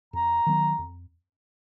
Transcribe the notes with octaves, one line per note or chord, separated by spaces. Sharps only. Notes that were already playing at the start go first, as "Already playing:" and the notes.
F2 A#5
D#3 F#3 B3
F2